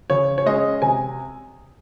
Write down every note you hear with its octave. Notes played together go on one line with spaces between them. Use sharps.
C#3 C#5
C#5
G#3 C#4 D#5
C3 G#5